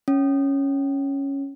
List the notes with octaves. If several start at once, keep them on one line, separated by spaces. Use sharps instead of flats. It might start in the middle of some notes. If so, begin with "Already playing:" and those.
C#4